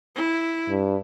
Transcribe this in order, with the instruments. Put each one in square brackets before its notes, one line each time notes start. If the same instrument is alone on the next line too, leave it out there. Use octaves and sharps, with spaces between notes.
[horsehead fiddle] E4
[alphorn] G2